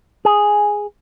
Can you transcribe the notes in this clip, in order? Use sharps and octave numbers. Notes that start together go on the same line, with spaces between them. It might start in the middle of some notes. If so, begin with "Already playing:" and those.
G#4